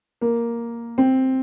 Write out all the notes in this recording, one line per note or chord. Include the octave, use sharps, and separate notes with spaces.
A#3
C4